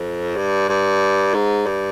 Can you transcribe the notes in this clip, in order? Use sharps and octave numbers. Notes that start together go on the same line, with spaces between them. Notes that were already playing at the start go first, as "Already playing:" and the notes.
Already playing: F2
G2
G2
G#2
G2